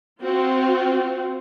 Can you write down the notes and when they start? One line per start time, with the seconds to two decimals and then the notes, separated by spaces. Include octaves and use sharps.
0.21 C4 F4 F#4